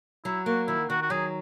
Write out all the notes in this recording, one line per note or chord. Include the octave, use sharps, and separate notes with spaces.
F#3 E4
A#3 F#4
D#3 E4
D#3 F#4
F#4
F#3 G#4